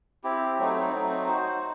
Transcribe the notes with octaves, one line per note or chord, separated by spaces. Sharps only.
C4 E4 G4
F#3 A3 C4 D#4
F#3 A3 C4 D#4
D#4 F#4 C5